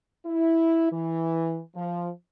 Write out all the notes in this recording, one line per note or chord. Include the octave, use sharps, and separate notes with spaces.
E4
E3
F3